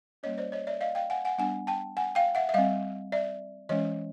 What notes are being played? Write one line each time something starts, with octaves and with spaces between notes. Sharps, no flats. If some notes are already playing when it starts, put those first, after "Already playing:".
G3 A#3 C#4 C#5 D#5
C5 D5
C#5 D#5
D5 E5
D#5 F5
F5 G5
F#5 G#5
F#5 G#5
G3 B3 D4 F#5 G#5
G5 A5
F#5 G#5
F5 G5
E5 F#5
E5
G3 C4 D#5 F5
D5 E5
E3 G#3 C#4 C#5 D#5